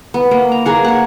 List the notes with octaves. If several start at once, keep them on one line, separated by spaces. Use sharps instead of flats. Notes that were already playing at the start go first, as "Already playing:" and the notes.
B3
A#3
A#5
A#3 G#4 F#5
C#5 F#5